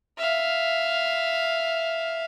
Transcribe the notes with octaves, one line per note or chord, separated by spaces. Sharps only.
E5 F5